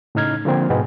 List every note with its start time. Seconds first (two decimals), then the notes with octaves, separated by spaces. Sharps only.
0.15 A2 C#3 D#4 F6 G#6
0.45 D3 F3 A#3 C4
0.70 G#2 B2 G#3 B3